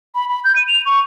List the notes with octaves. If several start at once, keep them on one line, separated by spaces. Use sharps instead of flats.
B5
B5
G6
D#7
F7
C#6